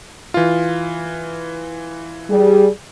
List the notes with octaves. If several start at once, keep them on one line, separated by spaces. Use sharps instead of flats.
E3 F4
G3 G#4